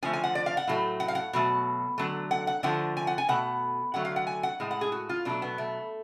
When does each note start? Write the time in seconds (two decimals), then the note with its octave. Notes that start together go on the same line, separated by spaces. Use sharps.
0.02 D3 F3 A3 G#5
0.13 G#5
0.24 F#5
0.35 D5
0.46 F5
0.57 F#5
0.68 A2 F#3 A3
1.00 F#5
1.08 F5
1.15 F#5
1.33 B2 F#3 A3
1.98 D3 F#3 A3
2.31 F#5
2.47 F#5
2.63 D3 F3 A3 F#5
2.97 G#5
3.07 F#5
3.18 G#5
3.29 B2 A3 F#5
3.94 D3 F#3 A3 F#5
4.05 F5
4.16 F#5
4.27 G#5
4.43 F#5
4.60 A2 G#3
4.71 F#5
4.81 G#4
4.92 F#4
5.09 F4
5.25 B2 F#3 A3 D4
5.42 B3
5.58 A3